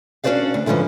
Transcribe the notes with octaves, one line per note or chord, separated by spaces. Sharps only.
C#4 D4 F#4 C5 D5 F5
D2
G#2 D3 E3 F3 C#4